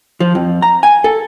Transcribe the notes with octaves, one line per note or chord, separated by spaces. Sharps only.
F3
F2
A#5
G#5
A4